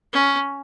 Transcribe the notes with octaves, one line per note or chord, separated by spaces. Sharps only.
C#4